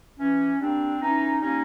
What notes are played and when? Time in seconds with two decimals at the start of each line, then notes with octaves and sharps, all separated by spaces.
0.19 E3 C#4
0.60 G3 A#3 C4 D4
1.01 E3 C#4 D#4
1.41 G3 A#3 C#4 D#4